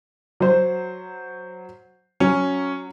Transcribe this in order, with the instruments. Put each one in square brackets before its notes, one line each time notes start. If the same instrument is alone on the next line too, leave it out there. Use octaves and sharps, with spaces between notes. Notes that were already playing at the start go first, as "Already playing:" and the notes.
[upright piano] F#3 C5
[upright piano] F#3 [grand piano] C#4